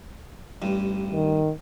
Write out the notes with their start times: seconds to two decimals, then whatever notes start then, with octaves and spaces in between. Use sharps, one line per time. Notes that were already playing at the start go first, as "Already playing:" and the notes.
0.62 A1 G2
1.13 D#3